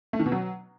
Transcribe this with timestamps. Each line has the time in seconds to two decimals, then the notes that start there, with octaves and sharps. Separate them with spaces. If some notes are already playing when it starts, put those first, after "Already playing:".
0.13 A3
0.19 D#3
0.26 B2
0.32 F#3